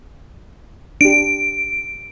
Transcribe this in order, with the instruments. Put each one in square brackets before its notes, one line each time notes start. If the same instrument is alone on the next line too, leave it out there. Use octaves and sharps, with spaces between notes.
[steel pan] D4 G4 [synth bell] D7